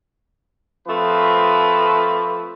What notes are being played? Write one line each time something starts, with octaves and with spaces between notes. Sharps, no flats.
F3 A3 C4 B4